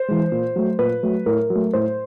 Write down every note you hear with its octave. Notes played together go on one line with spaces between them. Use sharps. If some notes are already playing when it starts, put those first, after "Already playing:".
Already playing: C5
E3 G#3
A#2
F#3 A3
A#2 B4
F#3 A3
A2 A#4
F#3
A3
A2 C5